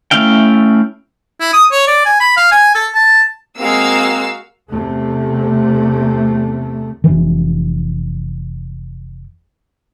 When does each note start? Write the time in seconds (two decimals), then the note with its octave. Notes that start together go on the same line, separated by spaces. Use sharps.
0.11 A3 C#4 E4 F5 G5
1.40 E4
1.53 D#6
1.71 C#5
1.87 D5
2.06 G#5
2.20 B5
2.37 F5
2.51 G#5
2.75 A4
2.94 A5
3.58 G#3 A#3 C4 F#4 F5 E6
4.71 E2 C3 A3
7.04 F1 E3